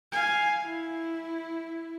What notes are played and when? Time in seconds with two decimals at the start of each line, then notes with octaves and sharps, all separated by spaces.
0.12 F5 G#5
0.61 E4